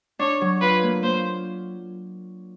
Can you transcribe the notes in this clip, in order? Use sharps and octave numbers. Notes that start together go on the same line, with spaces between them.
D4 C#5
F#3
F4 B4
A#3
A#3 C5